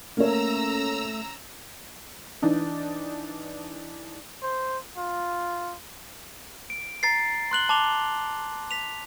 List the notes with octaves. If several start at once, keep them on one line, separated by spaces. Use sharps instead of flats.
A3 A#3 C#4 C#5 A#5 E6
E3 D4 D#4
C5
F4
D7
A#5 A6 C7
C6 F#6 F#7 G7
A5 D6 F7 G7
B6 F7